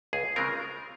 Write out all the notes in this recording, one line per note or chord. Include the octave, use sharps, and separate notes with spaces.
C#2 G#4
C#3 G#3 C4 F4 A#4